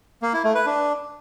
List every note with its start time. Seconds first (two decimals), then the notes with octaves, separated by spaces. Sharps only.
0.23 A#3
0.33 E4
0.44 A3
0.55 B4
0.66 D4